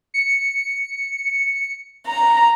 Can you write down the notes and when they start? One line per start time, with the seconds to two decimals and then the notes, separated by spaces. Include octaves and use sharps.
0.14 C#7
2.07 A#5